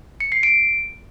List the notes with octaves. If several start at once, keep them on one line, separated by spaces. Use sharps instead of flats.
C#7
C7
D7